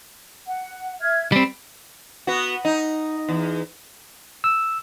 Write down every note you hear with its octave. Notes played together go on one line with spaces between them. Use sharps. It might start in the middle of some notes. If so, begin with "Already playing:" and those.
F#5
E5 F6 G#6
G3 C4 B5
B3 F#4
D#4
E2
E6